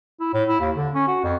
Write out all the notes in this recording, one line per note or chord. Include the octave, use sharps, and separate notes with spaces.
E4
A2
E4
D#2
D3
C#4
F#4
F2